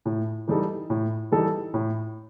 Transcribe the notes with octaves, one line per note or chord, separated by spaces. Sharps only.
A2
E3 G3 D#4 A4
A2
E3 G3 D#4 A4
A2